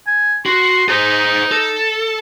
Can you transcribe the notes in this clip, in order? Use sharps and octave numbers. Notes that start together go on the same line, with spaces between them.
G#5
F#4 C6
D#4 G#4 C5
A4